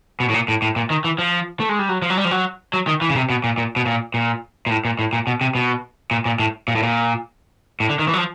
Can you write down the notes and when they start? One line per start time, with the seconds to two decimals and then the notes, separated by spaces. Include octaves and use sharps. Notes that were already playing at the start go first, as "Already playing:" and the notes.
0.20 B2
0.29 A2
0.34 A#2
0.48 A2
0.62 A2
0.76 A#2
0.90 D#3
1.04 E3
1.18 F3
1.60 A3
1.69 G#3
1.79 G3
1.89 F#3
2.02 F3
2.10 F#3
2.17 G3
2.25 F3
2.31 F#3
2.73 F#3
2.87 D#3
3.02 E3
3.10 C#3
3.16 C3
3.30 B2
3.44 A#2
3.58 A#2
3.76 B2
3.86 A#2
4.14 A#2
4.66 A#2
4.70 A2
4.85 A#2
4.99 A2
5.13 A#2
5.27 B2
5.41 C3
5.55 B2
6.11 A#2
6.26 A#2
6.39 A2
6.68 A#2
6.75 A2
6.83 A#2
7.80 A2
7.89 D3
7.99 D#3
8.08 E3
8.13 F#3
8.18 F3